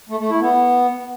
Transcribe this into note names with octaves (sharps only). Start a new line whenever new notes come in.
A3
A3
E4
B3